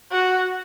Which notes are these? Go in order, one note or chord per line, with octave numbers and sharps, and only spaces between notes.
F#4